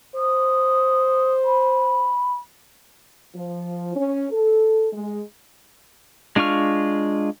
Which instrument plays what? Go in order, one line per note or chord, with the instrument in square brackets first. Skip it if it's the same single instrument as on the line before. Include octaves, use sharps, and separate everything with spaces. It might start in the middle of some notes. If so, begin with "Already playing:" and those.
[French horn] C5 [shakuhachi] D#6
[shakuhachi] B5
[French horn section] F3
C#4
A4
G#3
[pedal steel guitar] G#3 D4 F4 C#6 F6